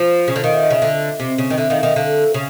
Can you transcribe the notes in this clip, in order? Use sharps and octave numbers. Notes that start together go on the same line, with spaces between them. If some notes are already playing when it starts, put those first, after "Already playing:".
Already playing: F3
C#3
D3
D#3 F5
E5
D#5
C#3 E5
D3
C3
C#3
D#3
D3 E5
D#3 F5
D#3 E5
D3 F5
C#3